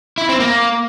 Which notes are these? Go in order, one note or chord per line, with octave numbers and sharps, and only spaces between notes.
E4
C4
A#3